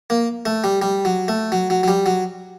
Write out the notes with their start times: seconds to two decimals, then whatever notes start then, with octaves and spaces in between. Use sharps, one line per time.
0.10 A#3
0.46 A3
0.64 G3
0.82 G3
1.05 F#3
1.28 A3
1.52 F#3
1.70 F#3
1.83 F#3
1.88 G3
2.06 F#3